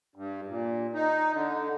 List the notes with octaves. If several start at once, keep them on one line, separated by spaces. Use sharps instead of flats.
G2
A#2
D#4
D3